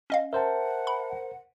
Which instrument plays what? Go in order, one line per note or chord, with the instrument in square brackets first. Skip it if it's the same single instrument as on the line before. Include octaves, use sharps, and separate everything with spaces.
[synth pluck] C#4 D#5 F5
[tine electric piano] A#4 C5 [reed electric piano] E5 A5 [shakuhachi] F#5
[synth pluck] B5